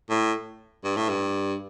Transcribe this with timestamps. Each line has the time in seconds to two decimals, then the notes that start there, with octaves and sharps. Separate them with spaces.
0.10 A2
0.84 G2
0.96 A2
1.09 G2